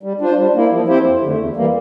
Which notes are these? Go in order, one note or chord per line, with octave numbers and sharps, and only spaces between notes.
G3
D4 F4 C5
G3
A#3 E4
F3
C4 E4 G4 C5
F2
D3 A3
E2
E3 G3 A#3